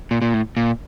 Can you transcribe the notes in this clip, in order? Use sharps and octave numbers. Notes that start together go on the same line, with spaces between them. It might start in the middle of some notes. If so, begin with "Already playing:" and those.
A#2
A#2
A2
A#2